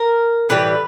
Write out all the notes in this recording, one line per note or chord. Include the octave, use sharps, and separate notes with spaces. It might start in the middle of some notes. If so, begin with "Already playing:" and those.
Already playing: A#4
A2 E3 G3 B4